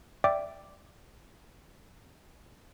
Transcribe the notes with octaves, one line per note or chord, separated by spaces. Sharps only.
D5 E5 G5 D6